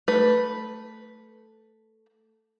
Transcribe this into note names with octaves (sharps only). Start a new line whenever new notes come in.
A3 B4